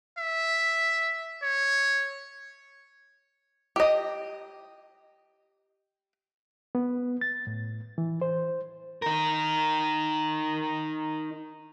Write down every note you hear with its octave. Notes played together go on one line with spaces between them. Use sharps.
E5
C#5
G4 D#5
B3
A6
A2
E3
C5
D#4 A#4